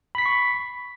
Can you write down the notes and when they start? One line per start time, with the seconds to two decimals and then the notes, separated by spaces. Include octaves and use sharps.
0.15 B5
0.18 B6
0.22 C7
0.26 C#6